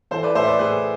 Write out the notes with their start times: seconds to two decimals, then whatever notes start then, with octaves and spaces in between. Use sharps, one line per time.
0.11 E3 A4 C5
0.23 B4 D5
0.35 A2 C5 E5
0.47 B4 D5
0.59 A2 G#4 B4